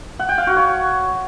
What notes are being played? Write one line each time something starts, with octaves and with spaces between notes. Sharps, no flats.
F#5
G5
F5
F#4
C#5